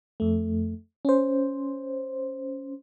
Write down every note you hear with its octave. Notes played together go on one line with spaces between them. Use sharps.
F2 A3
C#4 C5